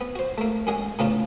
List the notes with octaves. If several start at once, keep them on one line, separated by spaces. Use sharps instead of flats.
B3
F#4 C5
A3 A#3
F#2 G#3 G#4 F#5
A2 C#3 F#3 B3 D4 F4